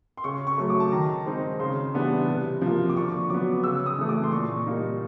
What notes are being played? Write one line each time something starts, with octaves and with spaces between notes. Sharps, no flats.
C6
C#3 C#6
C#6
F#3 A3
D6
A5
D#3 A#5
G#3 C4 D#4
C#3 C6
E3 G3 B3 D4
C3
F3 A#3
D6
D3 C#6
F#3 B3 D6
C#3 E6
D#6
E3 A3
D6
C6
A#2 C#6
G3 A#3 D#4